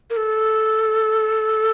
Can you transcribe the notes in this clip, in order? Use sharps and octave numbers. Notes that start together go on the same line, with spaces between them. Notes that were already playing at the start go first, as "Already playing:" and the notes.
A#4
A4